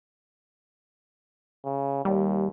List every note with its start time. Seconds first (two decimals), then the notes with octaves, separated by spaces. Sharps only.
1.65 C#3
2.05 D#2 G3